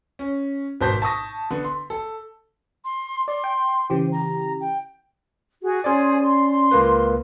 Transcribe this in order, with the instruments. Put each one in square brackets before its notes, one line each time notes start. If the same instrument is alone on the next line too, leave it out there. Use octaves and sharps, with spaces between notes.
[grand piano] C#4
G#1 B2 C5 A5 G6 B6
A5 C#6 D#6 A#6
D3 B3
C6
A4
[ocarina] C6
[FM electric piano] D5 [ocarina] C6
[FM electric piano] G5
[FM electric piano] C#3 E3 G4 [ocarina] C5
[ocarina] A#5
G5
[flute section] F#4 G#4
[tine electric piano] C#4 D5 [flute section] G#4 C5
[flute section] C6
[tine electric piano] C#2 A#3 B4